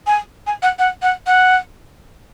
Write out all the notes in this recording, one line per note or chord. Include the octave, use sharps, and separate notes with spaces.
G#5
G#5
F#5
F#5
F#5
F#5